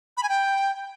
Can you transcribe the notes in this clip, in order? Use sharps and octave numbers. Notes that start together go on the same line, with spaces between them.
B5
G#5
G5